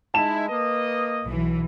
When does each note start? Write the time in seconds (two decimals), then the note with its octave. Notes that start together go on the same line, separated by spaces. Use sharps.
0.14 G#3 D#4 E4 A5 E7
0.48 A#3 B4 D#5
1.23 B1 E3